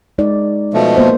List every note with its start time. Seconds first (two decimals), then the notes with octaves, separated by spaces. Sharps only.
0.18 G#3 D#4 D5
0.74 B2 F3 A3
0.97 A#3 B3 C5